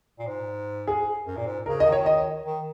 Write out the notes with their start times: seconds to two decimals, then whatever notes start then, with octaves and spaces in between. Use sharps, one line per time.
0.19 A#2
0.27 G#2
0.87 G#4
1.26 F#2
1.37 A#2
1.47 G#2
1.66 C#3 A#4
1.80 D#5
1.86 D#3
1.92 C#5
2.06 D#5
2.46 D#3